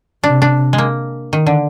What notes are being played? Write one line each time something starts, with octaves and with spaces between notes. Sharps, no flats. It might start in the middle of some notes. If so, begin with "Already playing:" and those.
C3 D4
D4
G#3
A#3
D#3
D3